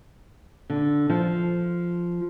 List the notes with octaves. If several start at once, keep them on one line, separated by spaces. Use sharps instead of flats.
D3
F3